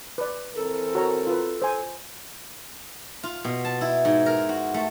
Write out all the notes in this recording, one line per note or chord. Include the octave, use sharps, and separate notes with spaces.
B4 D5
E3 C4 A4 A#4
F#4 C#5 A#5
F4 B4
C5 G#5
F4
B2
A5
E4
G#2
A#4
F#4
A3